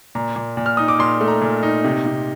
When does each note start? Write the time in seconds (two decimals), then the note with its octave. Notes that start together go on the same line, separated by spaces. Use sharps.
0.15 A#2 A#5
0.36 A#2
0.57 A#2
0.66 F6
0.77 D#4 D#6
0.88 D6
0.99 A#2 C6
1.21 A3
1.28 A#5
1.42 A#2
1.63 D#4
1.84 C3
2.06 C3